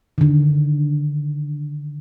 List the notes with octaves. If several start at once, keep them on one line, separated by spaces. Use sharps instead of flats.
D3 D#3